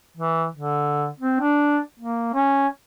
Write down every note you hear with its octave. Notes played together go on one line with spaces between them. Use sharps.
E3
D3
C4
D4
A#3
C#4